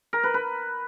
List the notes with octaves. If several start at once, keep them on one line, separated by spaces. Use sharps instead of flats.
A#4
B4
B4